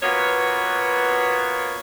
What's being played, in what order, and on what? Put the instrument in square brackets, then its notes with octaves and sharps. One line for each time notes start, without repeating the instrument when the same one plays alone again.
[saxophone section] B2 A#3 B3 F4 F#4 C#5